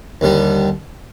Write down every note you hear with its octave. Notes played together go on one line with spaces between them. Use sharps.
D#2 D3 G3